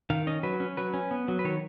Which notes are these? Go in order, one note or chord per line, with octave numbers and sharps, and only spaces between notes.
D#3 F5
C#4 D#5
F#3 B4
C#4
F#3 B4
C#4
B3
F#3
B4
D#3 C#5